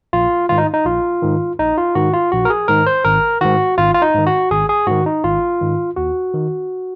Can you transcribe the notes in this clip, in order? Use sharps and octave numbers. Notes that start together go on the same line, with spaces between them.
A#1 F4
G#2 D#3 F4
D#4
D#4
A#1 F4
G#2 D#3
A#1 D#4
F4
G#2 D#3 F#4
F4
A#1 F#4
A#4
G#4
G#2 D#3 A#4
C5
G#1 A#4
G#2 D#3 F#4
G#1 F4
F4
D#4
G#2 D#3
F#4
G#1 G#4
G#4
G#2 D#3 F#4
D#4
G#1 F4
G#2 D#3
D#2 F#4
D#3